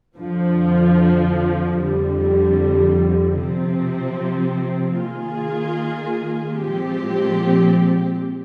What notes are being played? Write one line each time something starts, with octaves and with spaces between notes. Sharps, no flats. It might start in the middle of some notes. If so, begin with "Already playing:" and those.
F2 D3 F3
F2 D3 G3
C3 F3 C4
D#3 A#3 F4 G#4
A#2 F3 G#3 C4 G4